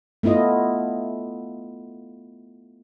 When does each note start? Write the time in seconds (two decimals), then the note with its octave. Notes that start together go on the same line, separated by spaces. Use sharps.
0.23 A3 B3 E4 F4 D#5